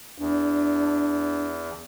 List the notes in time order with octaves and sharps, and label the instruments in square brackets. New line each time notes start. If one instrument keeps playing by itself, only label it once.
[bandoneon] E2 [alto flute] D4